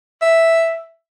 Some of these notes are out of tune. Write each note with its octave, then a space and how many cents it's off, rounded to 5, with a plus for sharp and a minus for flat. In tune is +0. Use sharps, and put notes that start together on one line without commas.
E5 +0